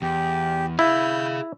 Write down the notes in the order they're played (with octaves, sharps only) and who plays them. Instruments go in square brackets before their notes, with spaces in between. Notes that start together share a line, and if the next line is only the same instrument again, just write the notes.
[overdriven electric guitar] E2 [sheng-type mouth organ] G4
[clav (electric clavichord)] E4 [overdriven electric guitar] G#4 F5 [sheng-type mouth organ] G6